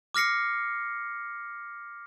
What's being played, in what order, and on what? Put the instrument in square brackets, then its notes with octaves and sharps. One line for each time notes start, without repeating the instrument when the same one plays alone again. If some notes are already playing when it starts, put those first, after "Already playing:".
[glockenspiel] D6 F6 A#6 C7 C#7